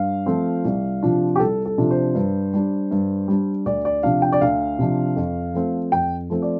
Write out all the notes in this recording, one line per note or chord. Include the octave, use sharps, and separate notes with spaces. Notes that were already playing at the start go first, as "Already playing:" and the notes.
Already playing: G2 F5
F3 A3 C4 F4
C2
C3 F3 D4 F4
G4
C2 A4
A4
C3 F3 D4 F4
C5
G2
G3 D4
G2
G3 D4
D2 D5
D5
C3 F3 D4 F5
G5
D5
D2 F5
C3 F3 D4
F2
F3 A3 C4
F2 G5
F3 A3 C4
D5